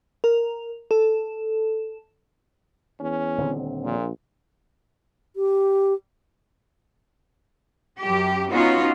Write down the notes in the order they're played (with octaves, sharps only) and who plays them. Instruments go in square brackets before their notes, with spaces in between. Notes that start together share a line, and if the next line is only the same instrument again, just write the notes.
[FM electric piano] A#4
A4
[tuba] E2 [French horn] C#4
[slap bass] D#1 D3 C4
[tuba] A#1 [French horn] A#2
[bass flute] G4
[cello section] F#2 G4
B3 C#4 D#4 F4 F#4